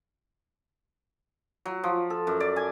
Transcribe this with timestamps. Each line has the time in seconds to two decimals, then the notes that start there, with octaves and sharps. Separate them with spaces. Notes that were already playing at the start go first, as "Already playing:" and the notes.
1.66 F#3
1.84 F3
2.10 A4
2.27 F#2
2.40 D5
2.56 G#5